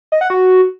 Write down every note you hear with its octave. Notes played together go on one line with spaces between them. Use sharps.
D#5
F#5
F#4